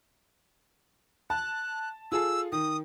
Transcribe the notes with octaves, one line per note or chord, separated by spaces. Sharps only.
A5 F#6
F4 G#4 A4 E6
D#3 D#6